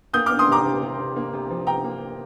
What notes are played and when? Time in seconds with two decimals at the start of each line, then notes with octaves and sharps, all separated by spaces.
0.14 A#3 D#6 G6
0.26 A#3 D6 F6
0.39 C6 D#6
0.48 C3 A#5 D6
0.65 C3
0.82 C3
0.98 C3
1.16 A#3
1.33 C3
1.50 F3
1.67 C3 G5 A#5
1.84 A#3
2.01 C3